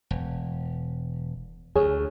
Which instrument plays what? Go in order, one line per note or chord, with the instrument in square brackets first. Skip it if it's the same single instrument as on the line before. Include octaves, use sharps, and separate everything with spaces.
[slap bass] E1
[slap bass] D2 [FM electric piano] G#4 C#5